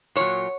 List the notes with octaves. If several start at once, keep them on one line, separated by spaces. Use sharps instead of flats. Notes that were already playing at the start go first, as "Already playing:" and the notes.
A#2 F#3 C#5